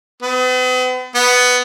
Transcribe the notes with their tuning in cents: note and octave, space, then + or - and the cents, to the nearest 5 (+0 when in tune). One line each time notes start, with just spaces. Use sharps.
B3 +45
B3 +5